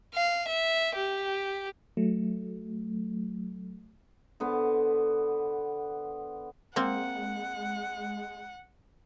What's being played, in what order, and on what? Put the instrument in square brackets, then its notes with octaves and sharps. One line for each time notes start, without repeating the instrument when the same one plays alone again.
[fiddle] F5
E5
G4
[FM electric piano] F#3 A3
[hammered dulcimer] D3 B3 C5
[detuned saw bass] G#3 [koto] A#3 C4 [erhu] F#5